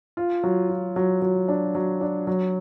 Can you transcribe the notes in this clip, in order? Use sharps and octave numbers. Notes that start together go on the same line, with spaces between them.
F4
F#3
F4
F#3
F#3
D4
F#3
D4
F#3